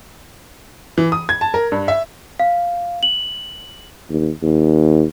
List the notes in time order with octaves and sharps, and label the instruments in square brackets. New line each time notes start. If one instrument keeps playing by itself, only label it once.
[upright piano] E3
D#6
G#6
A5
A#4
G2
E5
[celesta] F5
F#7
[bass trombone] D#2
D#2